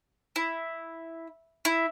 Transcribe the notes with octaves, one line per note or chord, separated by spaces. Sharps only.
E4
E4